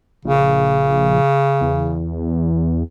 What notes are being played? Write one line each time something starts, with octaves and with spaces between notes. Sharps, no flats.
A#1 C#3
E2